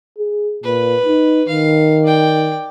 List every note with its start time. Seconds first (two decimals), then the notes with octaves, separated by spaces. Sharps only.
0.18 G#4
0.64 A#2 B4
1.05 D#4
1.49 D#3 F5
2.04 D5 G5